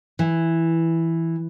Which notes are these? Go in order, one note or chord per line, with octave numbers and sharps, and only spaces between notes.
E3